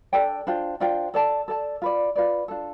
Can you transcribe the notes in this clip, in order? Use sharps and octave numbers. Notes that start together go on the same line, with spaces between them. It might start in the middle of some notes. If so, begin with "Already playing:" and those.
D4 A4 D5 G5
D4 F4 C5 G5
D4 F4 C5 G5
A4 D5 A5
A4 D5 A5
F4 B4 D5
F4 B4 D5
D4 F4 A4